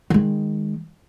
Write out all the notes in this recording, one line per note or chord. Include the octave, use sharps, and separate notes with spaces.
D#3 G#3